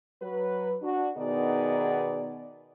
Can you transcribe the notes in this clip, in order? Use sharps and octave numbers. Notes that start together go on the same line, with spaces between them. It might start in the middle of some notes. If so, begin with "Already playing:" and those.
F#3 B4
D4 F#4
B2 D#3 B3 D#4 G#4 D5